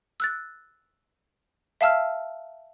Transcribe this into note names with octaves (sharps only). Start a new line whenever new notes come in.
E6 F#6 A6
E5 F5 A5 E6 F6